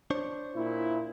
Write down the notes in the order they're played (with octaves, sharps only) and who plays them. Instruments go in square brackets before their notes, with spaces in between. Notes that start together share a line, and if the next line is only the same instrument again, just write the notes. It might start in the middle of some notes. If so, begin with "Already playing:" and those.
[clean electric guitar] D4 C5 C#5
[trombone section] A#2 E4